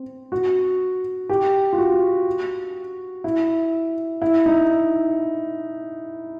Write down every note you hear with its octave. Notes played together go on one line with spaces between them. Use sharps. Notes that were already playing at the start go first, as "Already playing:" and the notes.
Already playing: C4
F#4
G4
F4
F#4
E4
E4
D#4